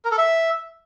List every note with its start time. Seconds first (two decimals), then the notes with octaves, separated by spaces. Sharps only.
0.05 A#4
0.11 A4
0.18 E5